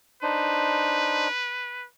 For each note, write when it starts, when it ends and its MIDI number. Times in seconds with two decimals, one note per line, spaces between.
0.23 1.28 62
0.23 1.28 63
0.23 1.86 71
0.23 1.28 72